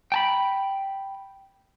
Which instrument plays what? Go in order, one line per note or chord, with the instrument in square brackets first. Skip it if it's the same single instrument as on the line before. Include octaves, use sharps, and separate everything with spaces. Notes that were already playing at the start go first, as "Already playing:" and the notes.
[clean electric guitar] G5 A5 B5